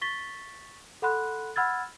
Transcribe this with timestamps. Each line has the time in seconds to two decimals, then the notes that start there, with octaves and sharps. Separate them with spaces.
0.01 C#6 A6 B6 G7
1.02 A4 F#5 B5 C6 F#6
1.56 F#5 B5 E6 F6 G#6 A6